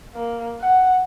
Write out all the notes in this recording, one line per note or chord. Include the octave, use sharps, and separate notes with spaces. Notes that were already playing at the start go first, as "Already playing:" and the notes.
A#3
F#5